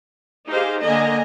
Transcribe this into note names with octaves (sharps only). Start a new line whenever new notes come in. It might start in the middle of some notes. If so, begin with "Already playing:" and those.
D#4 G4 G#4 C5 F5
D3 A#3 D#5 G#5 A#5